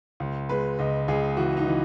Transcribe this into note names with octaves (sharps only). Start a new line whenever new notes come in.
C#2
G#3 B4
C#2 D#5
C#2 G#4
E3 F#4
D#4
E3